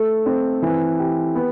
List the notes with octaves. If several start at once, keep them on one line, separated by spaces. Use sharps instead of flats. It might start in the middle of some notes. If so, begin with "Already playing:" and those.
Already playing: A3 A4
C4
E3
G4
B3